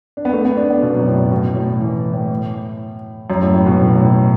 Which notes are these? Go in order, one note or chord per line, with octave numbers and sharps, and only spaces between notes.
D4
B3
A3
B3
D4
B3
B2
F#2
A2
A2
B2
A2
E3
A2
F#2
A2
A2
B2
A2
B2
A2